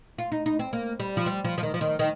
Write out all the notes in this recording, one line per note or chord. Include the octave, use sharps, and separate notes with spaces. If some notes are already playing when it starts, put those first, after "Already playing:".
F4
D#4
D#4
C4
A#3
G3
F3
G3
F3
F3
D#3
F3
D#3
D#3